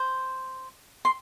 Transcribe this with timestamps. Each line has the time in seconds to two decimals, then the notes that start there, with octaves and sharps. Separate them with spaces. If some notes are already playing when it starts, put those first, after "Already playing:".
Already playing: C5
1.05 C6